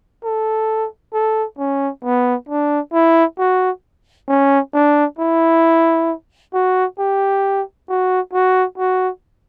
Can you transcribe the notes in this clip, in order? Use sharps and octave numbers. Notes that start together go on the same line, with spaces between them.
A4
A4
C#4
B3
D4
E4
F#4
C#4
D4
E4
F#4
G4
F#4
F#4
F#4